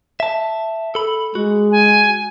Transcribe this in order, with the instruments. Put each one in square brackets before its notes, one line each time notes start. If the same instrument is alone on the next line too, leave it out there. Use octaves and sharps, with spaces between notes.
[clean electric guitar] E5 A5
A4 B5
[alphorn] G#3 [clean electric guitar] F#4
[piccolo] G#5